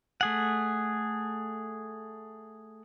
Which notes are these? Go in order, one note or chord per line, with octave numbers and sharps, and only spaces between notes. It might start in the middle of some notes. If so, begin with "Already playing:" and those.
A3 G#4 F#5